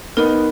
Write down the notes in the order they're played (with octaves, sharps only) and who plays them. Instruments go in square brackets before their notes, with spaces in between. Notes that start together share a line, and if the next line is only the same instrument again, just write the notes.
[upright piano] B3 D#4 [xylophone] A#4